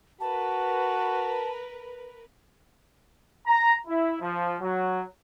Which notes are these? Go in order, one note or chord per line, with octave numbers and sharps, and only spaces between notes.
F#4 A#4 B4 A5
A#5
E4
F3
F#3